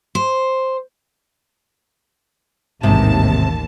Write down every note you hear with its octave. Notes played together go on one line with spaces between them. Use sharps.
C5
A1 D#2 G#2 C3 A5